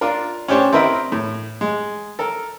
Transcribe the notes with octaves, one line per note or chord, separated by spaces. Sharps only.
D4 F4 A#4
C#4 D4 G4 C5 C#5
C4 E4 A#4 B4 D#5 B5
A2
G#3
A4 A#4